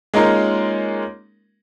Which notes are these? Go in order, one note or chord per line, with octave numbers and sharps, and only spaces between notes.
G#3 A#3 C#4 D#4 F4 A#4